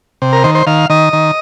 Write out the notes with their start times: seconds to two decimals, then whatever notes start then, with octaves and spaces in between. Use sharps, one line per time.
0.22 C3
0.33 A#4
0.44 D#3 C5
0.55 C5
0.67 D#3 F5
0.90 D#3 D#5
1.13 D#3